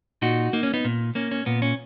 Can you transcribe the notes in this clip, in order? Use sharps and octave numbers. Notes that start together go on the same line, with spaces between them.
A#2 D#4 F#4
A#3 D#4
C#4
B3 D#4
A#2
A#3 C#4
C#4
A#2 B3
C#4